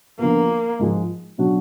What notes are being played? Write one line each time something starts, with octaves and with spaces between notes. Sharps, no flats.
D3 F3 A#3 B3
G#2 F3 G#3
B2 F#3 D4 F#4